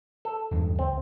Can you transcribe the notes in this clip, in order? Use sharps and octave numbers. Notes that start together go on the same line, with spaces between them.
A4
E2 G2 G#3
C#2 C4